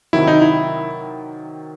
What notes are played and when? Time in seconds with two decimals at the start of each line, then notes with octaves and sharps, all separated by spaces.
0.13 C3 D#3 F#3 E4
0.28 D#4
0.42 E4